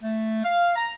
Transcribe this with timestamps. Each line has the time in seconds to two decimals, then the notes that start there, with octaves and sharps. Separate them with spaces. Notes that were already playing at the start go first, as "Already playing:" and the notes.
0.03 A3
0.44 F5
0.76 A#5